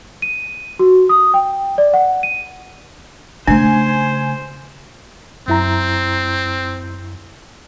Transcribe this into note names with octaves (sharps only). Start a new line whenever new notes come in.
D#7
F#4
D#6
G5
D5
F#5
D#7
C#3 A3 D4 C5 G#5
F#2 C4 E4 A#5